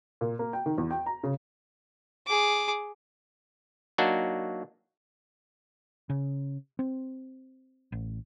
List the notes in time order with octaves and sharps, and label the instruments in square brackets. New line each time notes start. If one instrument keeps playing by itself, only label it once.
[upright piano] A#2
A#3
G5
D#3
E2
G5
A#5
C#3
[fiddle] G#4 D6
[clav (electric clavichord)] F#3 A#3 D4 D#4 F#4
[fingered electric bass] C#3
C4
A1